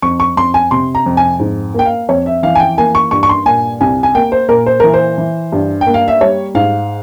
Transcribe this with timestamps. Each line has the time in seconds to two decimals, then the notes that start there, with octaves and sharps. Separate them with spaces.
0.02 F2 C#6
0.20 C#6
0.37 F2 C6
0.54 G#5
0.71 C3 C6
0.95 A#5
1.06 F2
1.17 G#5
1.40 G#2
1.74 A#3 G5
1.85 F5
2.09 F2 C#5
2.26 E5
2.43 E3 F5
2.55 G#5
2.60 G5
2.78 A#3 G#5
2.95 C#6
3.11 G2 C#6
3.23 C#6
3.29 C6
3.46 A#2 G#5
3.81 C2 G#5
4.03 G#5
4.15 A#3 G5
4.32 C5
4.49 A#2 A#4
4.66 C5
4.80 E3 A#4
4.94 C5
5.18 E3
5.52 G2
5.81 G5
5.86 A#3
5.94 F5
6.08 E5
6.21 G3 C#5
6.55 G#2 F5